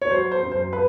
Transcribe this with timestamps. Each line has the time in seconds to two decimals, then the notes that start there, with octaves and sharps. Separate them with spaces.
0.02 C#5
0.11 F#3 C5
0.31 C5
0.42 F#2
0.52 C5
0.73 B4